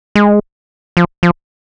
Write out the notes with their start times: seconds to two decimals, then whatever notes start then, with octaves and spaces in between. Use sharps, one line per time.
0.15 G#3
0.97 F3
1.23 F3